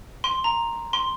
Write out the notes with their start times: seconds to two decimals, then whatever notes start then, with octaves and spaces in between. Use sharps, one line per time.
0.24 C6
0.44 A#5
0.93 C6